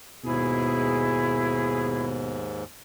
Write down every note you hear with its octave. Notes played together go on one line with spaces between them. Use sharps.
D#2 G#2 B2 E4 G#4